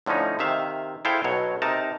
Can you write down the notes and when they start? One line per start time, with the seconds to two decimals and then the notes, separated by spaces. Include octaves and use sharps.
0.06 A2 D3 F3 C#4 D#4
0.39 C3 D#3 E5 F5
1.05 E4 G#4 A4 C5 F5 G5
1.24 B1 B2 F#3 C#5
1.62 C3 D#4 A#4 A5 A#5